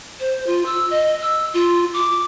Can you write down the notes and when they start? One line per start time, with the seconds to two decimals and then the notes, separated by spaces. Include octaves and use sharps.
0.20 C5
0.47 F4
0.66 E6
0.90 D#5
1.22 E6
1.54 F4
1.94 D6